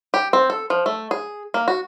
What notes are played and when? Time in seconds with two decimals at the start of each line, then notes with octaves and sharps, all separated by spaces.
0.14 G4
0.33 C4
0.50 A4
0.70 F3
0.86 A3
1.11 G#4
1.54 A#3
1.68 F#4